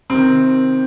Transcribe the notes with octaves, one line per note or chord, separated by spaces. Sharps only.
C3 D#3 C4